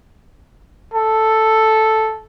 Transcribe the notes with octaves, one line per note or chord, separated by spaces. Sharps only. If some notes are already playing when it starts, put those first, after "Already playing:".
A4